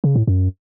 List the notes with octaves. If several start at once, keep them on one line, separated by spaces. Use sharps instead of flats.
C#3
A2
F#2